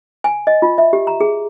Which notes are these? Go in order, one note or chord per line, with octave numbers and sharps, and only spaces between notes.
G#5
D#5
F4
E5
G4
A#5
G#4